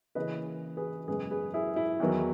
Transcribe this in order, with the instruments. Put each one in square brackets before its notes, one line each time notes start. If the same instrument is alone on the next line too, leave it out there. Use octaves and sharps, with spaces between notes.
[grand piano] C#3 E3 A#3 C#4 B4 D#5
G#4 B4
F#2 C#3 G#3 B3 G#4 B4
G#4 B4
E4 G#4
E4
E2 D#3 F#3 B3